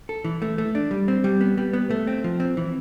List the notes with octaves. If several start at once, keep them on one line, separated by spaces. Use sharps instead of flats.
A4
E3
A3
A3
D4
G3
C4
G3
B3
G3
B3
A3
C4
F3
C4
E3